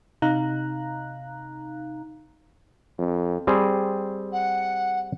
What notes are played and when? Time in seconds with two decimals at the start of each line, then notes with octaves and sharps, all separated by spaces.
0.22 C3 D#4 F5 A#5 F#6
2.99 F2
3.47 G3 C4 G#4
4.33 F#5